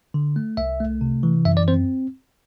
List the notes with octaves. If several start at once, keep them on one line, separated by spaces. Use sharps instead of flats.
D3
A3
C2 E5
A3
C3
E3
F#2 E5
D5
C4 C5